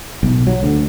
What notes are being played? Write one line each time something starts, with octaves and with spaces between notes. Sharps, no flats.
B1
F#3
D2